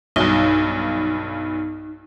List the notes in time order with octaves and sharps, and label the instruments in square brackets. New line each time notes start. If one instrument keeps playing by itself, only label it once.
[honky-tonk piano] B1 G2 [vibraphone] D#4